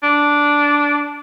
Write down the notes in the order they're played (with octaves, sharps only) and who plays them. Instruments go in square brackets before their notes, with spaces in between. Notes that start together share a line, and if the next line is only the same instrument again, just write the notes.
[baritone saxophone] D4